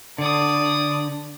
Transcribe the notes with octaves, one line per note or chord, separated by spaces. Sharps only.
D3 D5 D#6